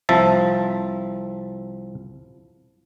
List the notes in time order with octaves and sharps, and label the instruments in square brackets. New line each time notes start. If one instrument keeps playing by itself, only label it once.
[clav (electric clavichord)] C2 F3 E5 A5